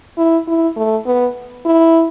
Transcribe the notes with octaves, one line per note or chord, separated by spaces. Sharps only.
E4
E4
A3
B3
E4